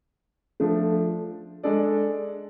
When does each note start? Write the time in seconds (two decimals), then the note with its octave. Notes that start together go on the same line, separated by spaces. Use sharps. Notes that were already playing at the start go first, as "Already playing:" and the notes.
0.60 F3 A3 D4
1.63 G#3 D4 A4 D5